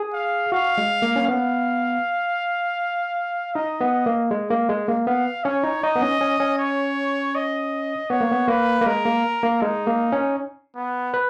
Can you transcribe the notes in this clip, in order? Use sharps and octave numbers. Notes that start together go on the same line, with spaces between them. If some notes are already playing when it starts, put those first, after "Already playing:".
Already playing: G#4
F5
F#4 F5
G#3
A#3
C#4
B3 F5
D#4 D#5
B3
A#3
G#3
A#3
G#3
A#3
B3 F5
C#4 C#5
D#4
D#4 D#5
B3
C#4
C#4
C#4
C#5
D#5
B3 C#5
A#3
B3
A#3 B4
A#3
G#3 A#4
A#3
A#3
G#3 D#4
A#3
C#4
B3
B4